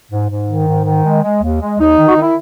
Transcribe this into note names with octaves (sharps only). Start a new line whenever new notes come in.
G#2
G#2
D#3
G#2
D#3
G#3
G#3
D#2
G#3
D#2 D#4
D#3
F#4
D#3
E4